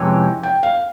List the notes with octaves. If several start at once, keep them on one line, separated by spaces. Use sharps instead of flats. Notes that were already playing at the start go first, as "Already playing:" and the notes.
Already playing: F2 C3 E3 G#3 C#4 G5
G5
F5